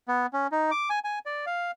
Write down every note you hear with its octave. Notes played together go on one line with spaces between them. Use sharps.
B3
C#4
D#4
D6
G#5
G#5
D5
F5